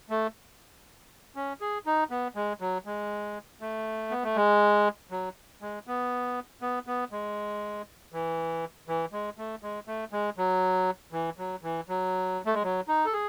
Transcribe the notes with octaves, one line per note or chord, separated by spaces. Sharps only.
A3
C#4
G#4
D#4
B3
G#3
F#3
G#3
A3
B3
A3
G#3
F#3
G#3
B3
B3
B3
G#3
E3
E3
G#3
A3
G#3
A3
G#3
F#3
E3
F#3
E3
F#3
A3
G#3
F#3
D#4
A4
G#4